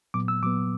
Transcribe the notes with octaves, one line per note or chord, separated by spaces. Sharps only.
A#2 F#3 B3 D6
E6
A#2 F#3 B3 D6